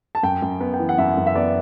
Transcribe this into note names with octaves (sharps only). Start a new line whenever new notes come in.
A5
F#2 G5
F#2
B3
G5
E3
F#5
F#2 E5
F#2
E5
B3 D5